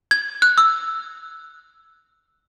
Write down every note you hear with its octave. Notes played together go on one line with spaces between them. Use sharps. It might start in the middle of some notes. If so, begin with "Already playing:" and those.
G#6
F#6
E6